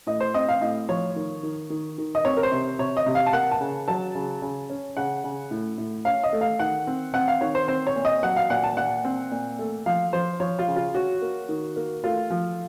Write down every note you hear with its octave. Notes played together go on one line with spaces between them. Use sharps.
A2 D#5
C5
C4 D#5
F5
A2 D#5
F3 C#5
D#3
D#3
D#3
D#3
D#5
C4 C#5
A#4
C5
C3
C3 C#5
D#5
C3
F5
A5
A#3 F#5
A5
C#3
F#3 A5
C#3
C#3
C#4
C#3 F#5
C#3
A2
A2
C#4 F5
D#5
A3
F5
D#3 F#5
C4
C4 F#5
F5
D#3 C#5
C5
C4 C5
C#5
A#2
D#5
F#3 F#5
F5
A#2 F#5
A5
A#2 F#5
C4
A#2
A3
F3 F5
F3 C5
F3 C#5
F4
C#3
F4
C#4 F#4
A#3
D#3
A#3
A3 F4
F3